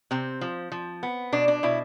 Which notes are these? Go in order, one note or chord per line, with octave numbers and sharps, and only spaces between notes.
C3 C4
F3
F3
B3
B2 D4
D4
B2 E4